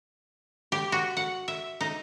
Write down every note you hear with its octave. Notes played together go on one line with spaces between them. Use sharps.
G4
F#4
F#5
E5
D#4